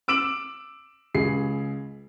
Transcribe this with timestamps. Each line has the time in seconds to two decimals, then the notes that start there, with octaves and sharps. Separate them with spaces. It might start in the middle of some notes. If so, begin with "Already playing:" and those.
0.08 D6 E6 D7 E7 F#7
1.15 C#2 G#4 C7